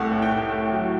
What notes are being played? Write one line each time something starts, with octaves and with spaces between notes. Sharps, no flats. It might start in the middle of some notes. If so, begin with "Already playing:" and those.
Already playing: C2 A3 F#5
A2
G5
A3
A3
F#3